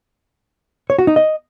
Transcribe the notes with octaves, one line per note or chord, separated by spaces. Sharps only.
C#5
F#4
D#4
D#5